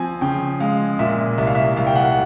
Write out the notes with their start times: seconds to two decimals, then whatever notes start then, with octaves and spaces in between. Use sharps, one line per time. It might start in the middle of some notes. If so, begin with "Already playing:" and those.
Already playing: F3 C4 G#5
0.21 C#3 G5
0.60 G#3 F5
0.99 A#2 E5
1.38 C2 E5
1.47 F5
1.55 E5
1.76 C2 F5
1.87 G5
1.96 F#5